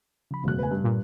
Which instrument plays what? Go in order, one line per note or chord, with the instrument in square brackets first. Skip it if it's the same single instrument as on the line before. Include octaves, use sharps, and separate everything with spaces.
[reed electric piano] C#3 F3 B5
[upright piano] E1 F#2 F#6 [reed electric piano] C#3 A3
[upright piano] B4 G#5
G2
[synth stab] A#2